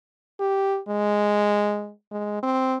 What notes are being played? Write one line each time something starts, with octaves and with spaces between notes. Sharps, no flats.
G4
G#3
G#3
C4